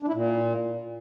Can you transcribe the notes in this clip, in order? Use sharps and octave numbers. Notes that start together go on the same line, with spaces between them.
D4
E4
A#2